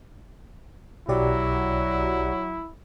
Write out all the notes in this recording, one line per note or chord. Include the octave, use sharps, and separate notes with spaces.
B1 F#3 E4 G4 D5